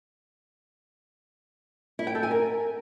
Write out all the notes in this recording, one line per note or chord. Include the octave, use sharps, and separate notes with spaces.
E4
G5
A4
G#5
A#4